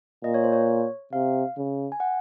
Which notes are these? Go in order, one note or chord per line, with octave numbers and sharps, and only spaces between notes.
A#2 D#5
C#5
C5
C#5
C3 F5
C#3
G#5
F#5